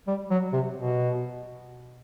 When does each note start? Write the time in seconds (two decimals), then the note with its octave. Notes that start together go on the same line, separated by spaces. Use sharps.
0.07 G3
0.31 F#3
0.53 C3
0.76 B2